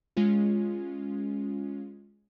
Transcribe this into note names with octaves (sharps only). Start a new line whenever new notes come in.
G#3 C#4 F4